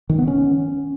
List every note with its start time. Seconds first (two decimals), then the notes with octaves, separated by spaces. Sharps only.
0.09 D#3
0.19 B3
0.28 C#4